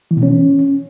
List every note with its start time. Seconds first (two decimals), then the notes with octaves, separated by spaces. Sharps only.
0.11 E3
0.17 B2
0.23 C#4